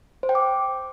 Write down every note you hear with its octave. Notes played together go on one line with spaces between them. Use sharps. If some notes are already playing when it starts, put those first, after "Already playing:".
C5
G5
D6